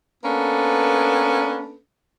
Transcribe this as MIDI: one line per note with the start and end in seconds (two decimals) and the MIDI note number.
0.24 1.77 58
0.24 1.77 59
0.24 1.77 61
0.24 1.77 62
0.24 1.77 69
0.24 1.77 71